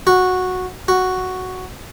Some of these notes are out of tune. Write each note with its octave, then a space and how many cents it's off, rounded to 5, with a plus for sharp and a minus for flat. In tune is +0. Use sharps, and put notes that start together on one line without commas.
F#4 -10
F#4 +0